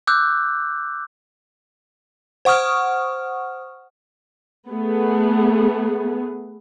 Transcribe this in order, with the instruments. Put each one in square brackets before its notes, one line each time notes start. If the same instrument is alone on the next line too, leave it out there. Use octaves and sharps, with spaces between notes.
[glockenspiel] D6 E6 F#6 G6
[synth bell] C5 F#5 C#6 D#6 F6
[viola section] A3 B3 G#4